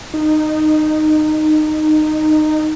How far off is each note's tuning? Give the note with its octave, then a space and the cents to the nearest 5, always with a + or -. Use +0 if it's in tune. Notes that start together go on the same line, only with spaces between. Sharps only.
D#4 -15